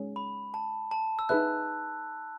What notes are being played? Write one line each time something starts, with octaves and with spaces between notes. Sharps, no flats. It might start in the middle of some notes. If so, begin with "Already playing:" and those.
Already playing: G#3 C#4 G#4
B5
A5
A5
E6
D#4 G#4 B4 E5 F#6